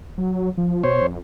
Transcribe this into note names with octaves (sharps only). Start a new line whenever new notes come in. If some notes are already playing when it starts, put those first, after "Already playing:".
F#3
F3
B2 C5 C#5
F2